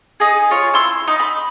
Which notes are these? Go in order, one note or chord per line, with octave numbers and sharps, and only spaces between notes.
D#4 G#4
F4 C#5
E4 C6 E6
D#4
B5